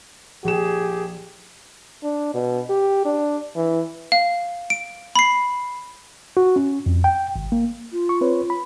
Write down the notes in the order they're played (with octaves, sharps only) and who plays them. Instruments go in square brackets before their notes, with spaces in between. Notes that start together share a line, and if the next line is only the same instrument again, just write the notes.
[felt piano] A#1 E7 [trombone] G4 [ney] G#4
[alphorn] D4
B2
G4
D4
E3
[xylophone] F5
D7
B5 C7
[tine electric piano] F#4
C#4
F2
G5
G#1
A#3
[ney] F4
[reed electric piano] C#6
C4 B4 C#5
B5